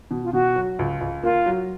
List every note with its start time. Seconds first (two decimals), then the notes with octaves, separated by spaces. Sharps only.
0.11 B2
0.24 F4
0.33 B2 F#4
0.56 F#3
0.79 C#2
1.01 C#2
1.23 A#3 F4
1.46 F#3